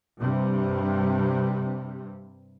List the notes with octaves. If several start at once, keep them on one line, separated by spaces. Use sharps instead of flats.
G2 C3 G3